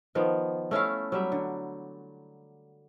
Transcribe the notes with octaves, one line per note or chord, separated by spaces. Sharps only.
D#3 F3 B3
A3 C#4 E4 F5
F#3 G3 E5
D3